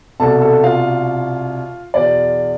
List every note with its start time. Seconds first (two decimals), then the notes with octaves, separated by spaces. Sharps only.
0.20 C2 B2 A4 A5
0.42 A4 A5
0.64 F4 F5
1.94 E2 B2 D5